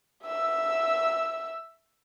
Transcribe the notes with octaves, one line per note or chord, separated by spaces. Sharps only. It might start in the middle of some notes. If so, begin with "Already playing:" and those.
E5 E6